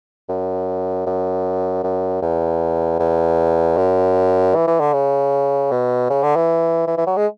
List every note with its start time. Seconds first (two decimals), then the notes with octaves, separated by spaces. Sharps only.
0.29 F#2
1.06 F#2
1.83 F#2
2.22 E2
2.99 E2
3.77 F#2
4.55 E3
4.67 E3
4.80 D3
4.94 C#3
5.71 B2
6.10 C#3
6.23 D3
6.36 E3
6.87 E3
6.97 E3
7.07 F#3
7.16 G#3